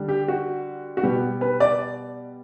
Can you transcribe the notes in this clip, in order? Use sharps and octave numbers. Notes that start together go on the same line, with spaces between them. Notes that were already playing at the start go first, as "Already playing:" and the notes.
Already playing: D3 G3
G4
F#4
F#4
B2 G3 B3 G4
B4
D5